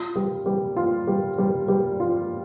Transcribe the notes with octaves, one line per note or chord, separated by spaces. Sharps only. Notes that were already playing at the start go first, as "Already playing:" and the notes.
Already playing: F4
G3
G3
F4
G3
G3
G3
F4